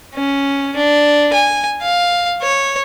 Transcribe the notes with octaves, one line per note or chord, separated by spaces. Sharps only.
C#4
D4
G#5
F5
C#5